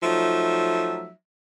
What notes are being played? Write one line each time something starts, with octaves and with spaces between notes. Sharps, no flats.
F3 F#3 A3 D#4 E5